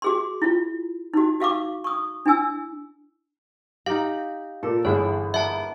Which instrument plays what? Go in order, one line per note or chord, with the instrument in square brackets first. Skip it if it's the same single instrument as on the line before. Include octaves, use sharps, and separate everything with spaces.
[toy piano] F#4 G#4 C6
E4 F4
D#4 F#4
F#4 F5 C#6 D6
C#6 D#6
D4 E4 G#5 E6
[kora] D#4 G4 [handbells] F5
[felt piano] A#2 [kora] A4
[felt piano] G1 G#4 [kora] E3 B3 E5 [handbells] C#5
[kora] A#3 B3 [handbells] E5 A5